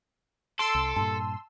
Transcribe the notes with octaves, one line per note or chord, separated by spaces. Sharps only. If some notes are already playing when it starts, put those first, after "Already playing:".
A4 C6 E6 D7
C2
G2 A#2 A5